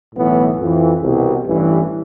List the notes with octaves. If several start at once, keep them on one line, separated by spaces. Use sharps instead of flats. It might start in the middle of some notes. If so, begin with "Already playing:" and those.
B1 A2 E3 B3
F2 E3
C2 B2
A1 G2 E3